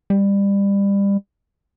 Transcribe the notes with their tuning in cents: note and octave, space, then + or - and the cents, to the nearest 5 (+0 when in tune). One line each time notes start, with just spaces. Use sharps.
G3 +25